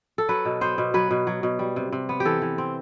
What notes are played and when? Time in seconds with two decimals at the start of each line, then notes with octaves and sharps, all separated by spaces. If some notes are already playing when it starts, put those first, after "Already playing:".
0.18 A4
0.29 F#3 B4
0.45 B2
0.61 B3 C5
0.78 B2
0.94 F#3 B4
1.11 B2
1.27 F#3
1.43 B2
1.59 G3
1.76 C3
1.92 C3
2.09 B3
2.20 G4
2.25 E3 A4
2.42 E3
2.58 C4